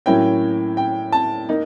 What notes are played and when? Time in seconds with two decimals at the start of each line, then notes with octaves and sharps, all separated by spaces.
0.06 A2 F#3 A#3 C#4 E4 G5
0.77 G5
1.12 A5
1.49 A#3 D#4